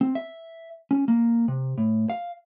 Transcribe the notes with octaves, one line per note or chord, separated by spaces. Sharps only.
C4
E5
C#4
A#3
C3
A2
F5